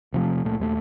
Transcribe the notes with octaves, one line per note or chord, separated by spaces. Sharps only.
E1 C3 F3 A3
C#2 A#2 A3
D#2 G3 A3